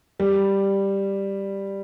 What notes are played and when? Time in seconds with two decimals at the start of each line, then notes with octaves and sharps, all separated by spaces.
0.20 G3